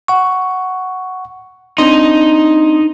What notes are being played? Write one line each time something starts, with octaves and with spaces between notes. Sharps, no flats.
F#5 C#6
C4 D4 D#4 C6